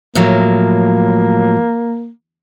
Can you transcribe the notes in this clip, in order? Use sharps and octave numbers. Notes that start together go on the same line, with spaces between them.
A2 F3 F#3 A#3